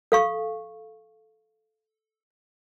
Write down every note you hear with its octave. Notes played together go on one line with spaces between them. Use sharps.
A4 F5 C#6